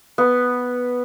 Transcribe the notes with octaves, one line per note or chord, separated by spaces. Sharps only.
B3